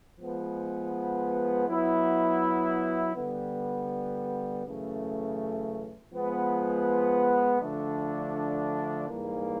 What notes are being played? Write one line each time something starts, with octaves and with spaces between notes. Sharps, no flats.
F3 G#3 B3
F#3 B3 E4
D3 G3 B3
F#2 C#3 E3 A3
F3 G#3 B3
D3 F3 A3 D4
G#2 E3 G3 A#3